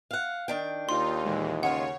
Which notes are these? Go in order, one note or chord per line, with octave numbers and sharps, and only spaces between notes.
F5 F#5
D#3 D4 G5
D#2 D#4 F4 C6
A#2 E3 G#3
C#3 G#3 F4 C#5 F#5